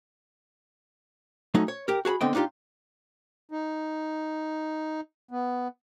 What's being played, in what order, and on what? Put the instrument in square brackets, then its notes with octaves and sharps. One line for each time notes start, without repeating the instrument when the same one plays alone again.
[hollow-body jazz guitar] F#3 A3 C#4 D#4
C#5
G4 A#4
F#4 G#4 A5 B5
D3 B3 C4 D#5 G5
D4 D#4 F4 G4
[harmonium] D#4
B3